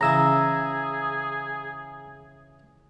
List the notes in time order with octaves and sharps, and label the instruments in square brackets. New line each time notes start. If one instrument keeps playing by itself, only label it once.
[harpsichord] C#3 E3 C#4 [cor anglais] G#4 [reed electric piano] A#5 E6